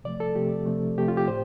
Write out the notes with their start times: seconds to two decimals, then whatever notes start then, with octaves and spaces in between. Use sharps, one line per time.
0.04 C3 F3 A3 D5
0.20 A4
0.35 C3 F3 A3 G4
0.66 C3 F3 A3
0.98 C3 F3 A3 G4
1.08 F4
1.17 G4
1.28 A2 C5